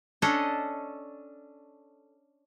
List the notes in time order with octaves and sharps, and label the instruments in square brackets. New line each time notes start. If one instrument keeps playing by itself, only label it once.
[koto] C#4 D4 A4 D#5